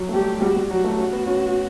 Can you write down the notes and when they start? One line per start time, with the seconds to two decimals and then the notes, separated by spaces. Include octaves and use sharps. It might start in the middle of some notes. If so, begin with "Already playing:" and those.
Already playing: F#3
0.09 A3
0.14 G3 G4
0.42 G3 F#4
0.56 G3
0.71 F#3 F#4
0.84 A3
0.98 C#4 F#4
1.12 B3
1.27 C#4